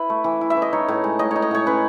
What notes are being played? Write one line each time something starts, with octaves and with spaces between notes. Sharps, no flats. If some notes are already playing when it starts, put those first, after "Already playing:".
Already playing: E4 B4
A3
E3
E4
E5
E3
D#5
D#4 C#5
A2
G#3
A2 D#5
D#4 C#5
D#5
A2 C#5
C#4 B4